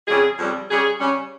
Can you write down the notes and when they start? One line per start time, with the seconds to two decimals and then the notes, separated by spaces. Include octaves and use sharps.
0.08 F2 C#3 G3 G#4
0.38 F2 C#3 G3
0.70 C#3 G3 C#4 G#4
1.00 C#3 G3 C#4